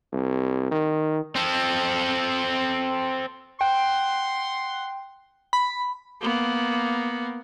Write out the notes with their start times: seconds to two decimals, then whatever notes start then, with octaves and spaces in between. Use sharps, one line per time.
0.13 C2
0.71 D#3
1.36 C4 A4
3.61 F#5 G5 C6
5.53 B5
6.22 A#3 B3